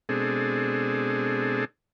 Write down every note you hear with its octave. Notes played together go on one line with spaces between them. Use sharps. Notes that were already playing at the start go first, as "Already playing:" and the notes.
B2 G#3 C4 D4 G#4 A4